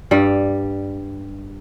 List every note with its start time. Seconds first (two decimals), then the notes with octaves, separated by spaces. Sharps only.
0.11 G2 G3